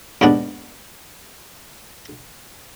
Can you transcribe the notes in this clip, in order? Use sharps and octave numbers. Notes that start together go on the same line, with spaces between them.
D#2 G#2 B3 D4